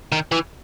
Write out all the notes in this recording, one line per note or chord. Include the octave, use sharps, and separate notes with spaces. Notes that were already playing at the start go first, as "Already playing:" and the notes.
D#3
E3